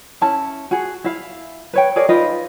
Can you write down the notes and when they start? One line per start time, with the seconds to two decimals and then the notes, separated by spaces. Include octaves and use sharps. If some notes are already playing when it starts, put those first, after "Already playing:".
0.21 C#4 E4 A5
0.71 F#4 G#4
1.04 E4 E5 F5
1.73 B4 C#5 G5
1.96 G#4 A#4 C#5 D5
2.09 D#4 F4 B4 D#5